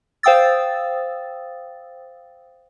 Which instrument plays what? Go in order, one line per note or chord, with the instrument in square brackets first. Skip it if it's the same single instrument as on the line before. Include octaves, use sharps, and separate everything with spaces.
[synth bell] C5 F5 G5 D#6 E6 A6